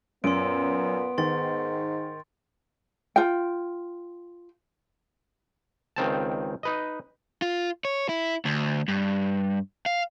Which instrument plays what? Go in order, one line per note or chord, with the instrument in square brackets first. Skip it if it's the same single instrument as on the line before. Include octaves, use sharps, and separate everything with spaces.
[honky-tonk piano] F#2 [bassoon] A#2 [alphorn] B3 [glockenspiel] C6 D7
[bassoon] G#2 [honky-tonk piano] D#3 [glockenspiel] C6 A6
[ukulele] F4 G5
[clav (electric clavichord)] C#2 D#3 C4 A5
D#4 B4 D#5
[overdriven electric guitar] F4
C#5
E4
D2
G2
F5